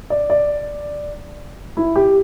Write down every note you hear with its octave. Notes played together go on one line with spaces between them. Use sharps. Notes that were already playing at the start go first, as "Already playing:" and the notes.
D5
D5
E4
G4